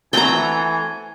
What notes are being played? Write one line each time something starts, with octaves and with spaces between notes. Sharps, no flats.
E3 A3 C4 F#4 G5 G#5 A#5